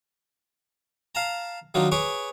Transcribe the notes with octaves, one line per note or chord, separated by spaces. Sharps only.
F5 A5 A#5
D#3 F#3 D4 D#4 F4
G#4 B4 C#5 C#6 D6